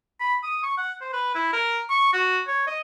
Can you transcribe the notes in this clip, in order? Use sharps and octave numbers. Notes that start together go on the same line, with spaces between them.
B5
D#6
C#6
F#5
C5
B4
E4
A#4
C#6
F#4
C#5
D#5